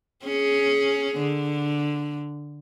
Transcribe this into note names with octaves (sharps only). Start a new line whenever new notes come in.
C#4 G#4
D3